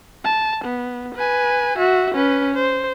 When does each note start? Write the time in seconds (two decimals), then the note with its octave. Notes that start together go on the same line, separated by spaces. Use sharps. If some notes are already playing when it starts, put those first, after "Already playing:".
0.24 A5
0.65 B3
1.15 B4 G#5
1.78 F#4 E5
2.15 C#4 B4
2.55 C5